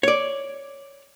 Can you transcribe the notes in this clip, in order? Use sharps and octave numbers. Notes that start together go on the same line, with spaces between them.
C#5 D5